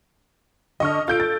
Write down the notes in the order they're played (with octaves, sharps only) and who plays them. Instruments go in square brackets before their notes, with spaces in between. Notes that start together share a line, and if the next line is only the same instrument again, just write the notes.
[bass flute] D3 [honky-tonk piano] D#5 C#6 F6
[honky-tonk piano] F4 G6 D7 [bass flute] A4
[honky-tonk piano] A6